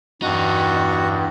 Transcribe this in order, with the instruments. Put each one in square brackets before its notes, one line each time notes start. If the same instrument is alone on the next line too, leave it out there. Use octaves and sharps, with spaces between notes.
[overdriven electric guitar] E2 D#4 [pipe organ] G2 [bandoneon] F#4